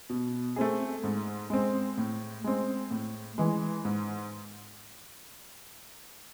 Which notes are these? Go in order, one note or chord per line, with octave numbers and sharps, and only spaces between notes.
B2
A3 C4 G#4
G#2
G#3 C4
A2
G#3 C4
A2
E3 G#3
G#2